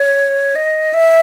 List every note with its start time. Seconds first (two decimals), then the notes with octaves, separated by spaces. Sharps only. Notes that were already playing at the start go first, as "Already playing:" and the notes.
Already playing: C#5
0.56 D#5
0.94 E5